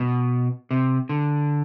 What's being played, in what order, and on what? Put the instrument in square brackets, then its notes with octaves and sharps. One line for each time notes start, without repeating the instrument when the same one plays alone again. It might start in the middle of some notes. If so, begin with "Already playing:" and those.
Already playing: [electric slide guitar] B2
C3
D3